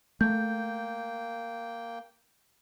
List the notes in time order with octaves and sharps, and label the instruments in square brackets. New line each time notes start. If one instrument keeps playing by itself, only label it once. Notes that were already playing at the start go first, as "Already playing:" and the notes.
[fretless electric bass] A3 [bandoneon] A#3 G5 [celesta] G6